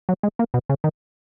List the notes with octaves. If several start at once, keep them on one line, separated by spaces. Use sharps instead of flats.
F#3
G#3
A#3
B2
C#3
D#3